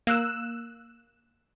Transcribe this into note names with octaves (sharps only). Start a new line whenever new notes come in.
A#3 E6 F#6 E7